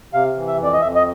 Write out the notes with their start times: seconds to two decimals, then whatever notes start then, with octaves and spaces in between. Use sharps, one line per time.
0.14 C3 F5
0.36 E3
0.47 E5
0.58 F2
0.63 D5
0.73 D#5
0.81 F2 E5
0.95 D#5